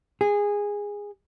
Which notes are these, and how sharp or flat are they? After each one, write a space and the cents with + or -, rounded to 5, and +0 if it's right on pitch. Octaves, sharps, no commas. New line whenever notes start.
G#4 -15